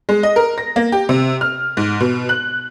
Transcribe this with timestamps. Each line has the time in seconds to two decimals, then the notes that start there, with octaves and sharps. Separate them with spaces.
0.09 G#3
0.23 D#5
0.36 A#4
0.58 A#6
0.76 A#3
0.92 G4
1.09 C3
1.41 F6
1.77 G#2
2.00 B2
2.29 F#6